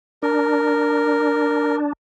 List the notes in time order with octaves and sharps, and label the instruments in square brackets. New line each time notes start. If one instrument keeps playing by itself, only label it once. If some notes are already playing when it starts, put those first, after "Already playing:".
[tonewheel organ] D4 [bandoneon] A#4